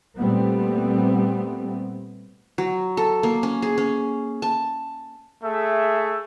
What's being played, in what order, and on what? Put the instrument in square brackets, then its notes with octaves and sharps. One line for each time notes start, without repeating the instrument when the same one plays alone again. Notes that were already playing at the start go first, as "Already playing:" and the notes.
[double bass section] A#2 G3 A3 B3 C4
[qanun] F#3
A4
A#3
C#4
G#4
C#4
A5
[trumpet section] A3 G#4 E5